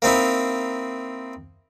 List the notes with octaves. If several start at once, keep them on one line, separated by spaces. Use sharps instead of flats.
A#3 C4 D#4 E4